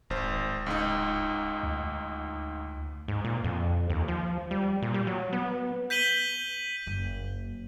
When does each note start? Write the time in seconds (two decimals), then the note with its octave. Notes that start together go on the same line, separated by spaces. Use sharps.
0.10 D1 G#1 C5
0.66 C#2 G#2 D#4
1.63 D2
3.08 G#2
3.25 A#2
3.44 F2
3.90 D#2
4.08 F3
4.51 G3
4.82 A#2
4.94 G3
5.07 F#3
5.33 B3
5.90 G6 B6 D#7 F#7 G7
6.87 F#1 A#3